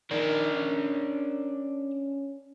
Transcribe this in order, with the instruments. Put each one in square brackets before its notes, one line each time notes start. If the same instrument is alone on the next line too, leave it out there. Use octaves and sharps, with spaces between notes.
[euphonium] D#3 [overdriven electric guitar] D4 A#4
[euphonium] C#4